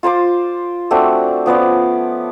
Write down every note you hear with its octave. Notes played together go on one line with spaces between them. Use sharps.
F4 C5 C6 D6
A3 C4 D4 F#4
F3 B3 C#4 D5